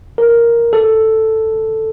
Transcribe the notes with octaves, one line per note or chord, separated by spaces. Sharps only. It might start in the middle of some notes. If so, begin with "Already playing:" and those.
A#4
A4